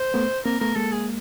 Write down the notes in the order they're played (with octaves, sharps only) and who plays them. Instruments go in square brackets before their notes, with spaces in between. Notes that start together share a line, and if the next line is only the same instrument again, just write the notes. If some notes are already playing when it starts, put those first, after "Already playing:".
Already playing: [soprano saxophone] C5
[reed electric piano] A3 B3
[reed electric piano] A#3 C4 [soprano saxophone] A#4
[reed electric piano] A3 B3 [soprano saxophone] A#4
[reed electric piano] G#3 A#3 [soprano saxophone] A4
[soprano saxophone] G#4